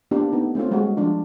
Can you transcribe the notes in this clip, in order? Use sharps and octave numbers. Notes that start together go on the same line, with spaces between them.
A#3 B3 D4 F4 G4
A3 B3 D#4
A3 C4 C#4 F4
G3 G#3 A#3 C4 F#4 G4
F3 D4 F4